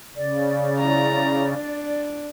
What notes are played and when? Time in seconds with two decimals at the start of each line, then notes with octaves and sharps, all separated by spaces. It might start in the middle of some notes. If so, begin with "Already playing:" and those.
0.16 C#3 D5
0.79 E4 A#5
1.49 D4